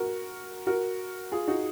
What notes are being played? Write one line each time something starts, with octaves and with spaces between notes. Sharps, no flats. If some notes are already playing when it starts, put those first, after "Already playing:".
Already playing: F#4 A#4
F#4 A#4
F4 G#4
D#4 F#4